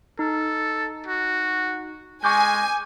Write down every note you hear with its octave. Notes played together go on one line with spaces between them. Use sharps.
D#4 A4
F#4
G#3 G#5 C#6 D6 G6